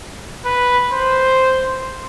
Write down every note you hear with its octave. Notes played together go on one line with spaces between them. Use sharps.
B4
C5